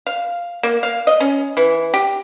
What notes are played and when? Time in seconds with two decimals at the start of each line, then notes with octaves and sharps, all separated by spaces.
0.07 F5
0.63 A#3
0.83 F5
1.07 D#5
1.20 C#4
1.57 E3
1.94 G4